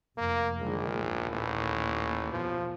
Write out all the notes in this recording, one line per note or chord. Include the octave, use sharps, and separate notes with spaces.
F1 A#3
A#1 D3 D#3 G#3
D#2 A#2 D#3
A1
E2 B2 F3